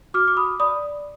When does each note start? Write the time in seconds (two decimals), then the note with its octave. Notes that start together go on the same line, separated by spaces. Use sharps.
0.14 F#4 D6 F6
0.28 D6
0.37 B5 D#6
0.60 D5 B5 D#6